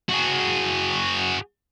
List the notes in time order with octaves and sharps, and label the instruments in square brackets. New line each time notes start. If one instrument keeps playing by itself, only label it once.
[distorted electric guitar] F#4 G#4